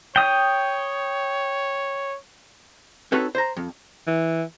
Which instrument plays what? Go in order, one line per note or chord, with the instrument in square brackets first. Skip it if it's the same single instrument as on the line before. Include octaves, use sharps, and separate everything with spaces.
[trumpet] C#5 [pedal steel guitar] G5 D#6
[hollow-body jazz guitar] C4 D#4 F#4 A4 B4 C#5
C5 A#5
F2
[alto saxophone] E3